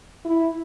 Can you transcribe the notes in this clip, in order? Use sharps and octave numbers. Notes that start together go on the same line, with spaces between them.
E4